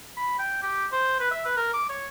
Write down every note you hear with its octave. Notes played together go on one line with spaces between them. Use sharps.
B5
G5
G4
C5
B4
E5
B4
A#4
D6
C#5